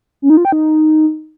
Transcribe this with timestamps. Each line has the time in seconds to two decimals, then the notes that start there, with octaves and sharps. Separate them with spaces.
0.22 C#4
0.30 D#4
0.37 F4
0.45 G5
0.52 D#4